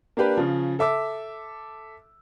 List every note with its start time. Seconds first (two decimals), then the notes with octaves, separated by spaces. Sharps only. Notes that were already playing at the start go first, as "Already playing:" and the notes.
0.17 A#3 D4 G4 B4
0.37 C#3 F3
0.79 A4 E5 D6 E6